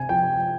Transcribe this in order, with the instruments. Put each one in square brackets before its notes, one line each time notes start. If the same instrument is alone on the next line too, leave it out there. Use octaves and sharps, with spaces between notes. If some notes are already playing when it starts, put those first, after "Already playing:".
Already playing: [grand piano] C3 G#5
F3 G5